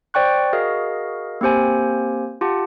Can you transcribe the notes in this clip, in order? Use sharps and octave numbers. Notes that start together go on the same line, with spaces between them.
C5 D5 G5 C#6 F#6
F#4 G#4 A#4 D#5 F5
A#3 C4 G4 C5 G#5
F4 G4 F#5 A5